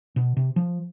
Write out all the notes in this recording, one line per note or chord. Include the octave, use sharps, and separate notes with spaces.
B2
C3
F3